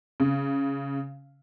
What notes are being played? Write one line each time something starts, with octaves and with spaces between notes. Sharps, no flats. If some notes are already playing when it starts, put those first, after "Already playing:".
C#3